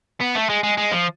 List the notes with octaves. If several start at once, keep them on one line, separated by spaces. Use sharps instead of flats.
B3
A3
G#3
G#3
G#3
F3